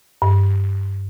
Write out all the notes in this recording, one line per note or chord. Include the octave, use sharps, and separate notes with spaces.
G2